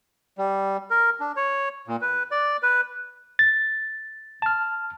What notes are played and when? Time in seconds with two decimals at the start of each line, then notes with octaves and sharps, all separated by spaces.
0.38 G3
0.90 A#4
1.20 D4
1.37 C#5
1.88 A#2
2.01 B4
2.31 D5
2.63 B4
3.39 A6
4.42 A5 F6